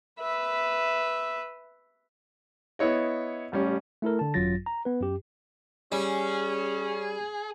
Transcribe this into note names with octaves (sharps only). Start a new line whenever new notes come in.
B4 E5
B3 E4 C#5 D#5
A1 G3 C#4
A3 E4 A4 A#4
D3 A5
G#1 F#2 F#3 F4 A6 A#6
A#5
B3 B4
F#2 G4
G3 C#4 G#4